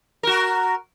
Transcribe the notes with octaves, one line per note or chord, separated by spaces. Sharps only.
F#4 A#4